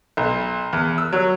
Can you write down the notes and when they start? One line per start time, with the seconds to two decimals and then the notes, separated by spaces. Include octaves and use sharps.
0.17 B1
0.73 E2
0.98 E6
1.13 F#3